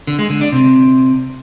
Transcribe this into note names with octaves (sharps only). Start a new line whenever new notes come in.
D3
G#3
D3
D4
C3